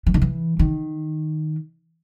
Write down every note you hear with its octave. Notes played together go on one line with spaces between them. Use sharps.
E3
D#3
E3
D#3